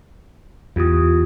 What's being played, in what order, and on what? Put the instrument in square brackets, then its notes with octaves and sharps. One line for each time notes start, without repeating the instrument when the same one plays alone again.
[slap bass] E2 [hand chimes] F4 G4 D#6